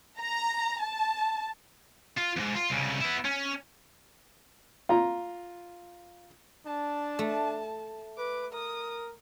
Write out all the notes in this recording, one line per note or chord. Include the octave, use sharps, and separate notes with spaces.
A#5
A5
F4
E2 G#2
F4
C2 C#3
B3 E4
C#4
F4 A#5
D4 A5
A3
B4 D6
A#4 D#6